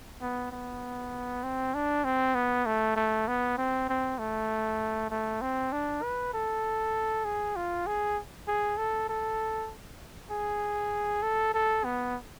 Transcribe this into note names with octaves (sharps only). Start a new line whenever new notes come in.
B3
B3
C4
D4
C4
B3
A3
A3
B3
C4
C4
A3
A3
C4
D4
B4
A4
G#4
F4
G#4
G#4
A4
A4
G#4
A4
A4
B3